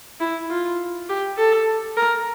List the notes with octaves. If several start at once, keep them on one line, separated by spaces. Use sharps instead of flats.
E4
F4
G4
A4
A#4